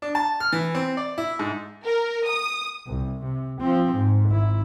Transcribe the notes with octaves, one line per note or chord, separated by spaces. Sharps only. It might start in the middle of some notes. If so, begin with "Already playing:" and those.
D4
A5
F6
E3
C4
D5
E4
G#2
A#4
D#6
C2
C3
F3 C4
G#2
G#1 E4